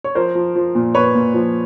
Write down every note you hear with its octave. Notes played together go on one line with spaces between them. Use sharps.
C#5
F3 A#4 C5
F3
F3
A#2
A#2 B4 C#5
A#2
F3